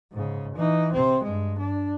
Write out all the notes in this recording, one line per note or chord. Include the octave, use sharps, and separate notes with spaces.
G#2 C#3
E3 D#4
C3 C4
G2 G#3
D4